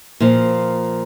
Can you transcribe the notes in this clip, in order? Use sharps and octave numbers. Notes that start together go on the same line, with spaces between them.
A#2 F3